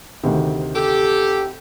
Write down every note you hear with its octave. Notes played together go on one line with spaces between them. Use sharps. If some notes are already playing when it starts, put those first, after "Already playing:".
D2 C3 D#3
G4 A4